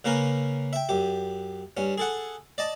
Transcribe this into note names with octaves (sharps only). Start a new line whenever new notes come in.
C#3 A#3 C#4 A#4 B4
E5 G5
F#2 G4
G2 C#4
G#4 A4 F#5
D5 D#5 A5